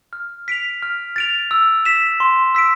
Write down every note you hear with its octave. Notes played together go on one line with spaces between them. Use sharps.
F6
B6 D7 F7
F6
A6 D7 F7
E6
B6 E7
C6
E6 B6 D7